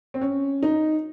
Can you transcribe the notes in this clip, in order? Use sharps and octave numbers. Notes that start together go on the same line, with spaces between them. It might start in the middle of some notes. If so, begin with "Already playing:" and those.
C4
C#4
D#4